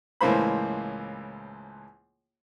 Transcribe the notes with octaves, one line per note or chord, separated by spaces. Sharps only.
C#2 A2 E3 A#3 C5 B5